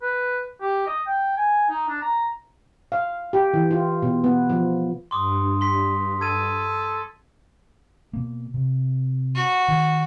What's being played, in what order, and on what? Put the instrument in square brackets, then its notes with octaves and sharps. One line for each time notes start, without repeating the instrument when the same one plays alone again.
[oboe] B4
G4
D#5
G5
G#5
D#4
D4
A#5
[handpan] F5
G4
E3
F4
B2
B3
F3
[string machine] G2 [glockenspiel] C6 D6 D#6
[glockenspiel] C6 B6
[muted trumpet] A4 [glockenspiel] G#6 D#7
[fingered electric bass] B2 A#3
C3
[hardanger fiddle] F#4
[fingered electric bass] D#3